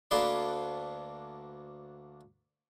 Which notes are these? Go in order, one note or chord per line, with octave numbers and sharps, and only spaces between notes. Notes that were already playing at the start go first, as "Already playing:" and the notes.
D2 A#3 D4 A4 B4 C6